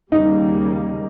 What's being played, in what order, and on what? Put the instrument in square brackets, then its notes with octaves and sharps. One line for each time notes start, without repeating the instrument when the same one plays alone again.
[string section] D#2 C#3 G3 A#3 [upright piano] D#4